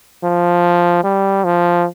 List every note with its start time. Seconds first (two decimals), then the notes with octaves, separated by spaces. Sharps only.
0.24 F3
1.04 G3
1.44 F3